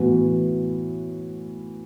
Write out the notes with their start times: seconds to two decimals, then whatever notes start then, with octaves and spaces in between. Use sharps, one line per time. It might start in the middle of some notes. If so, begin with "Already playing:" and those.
Already playing: A2 E3 B3 F#4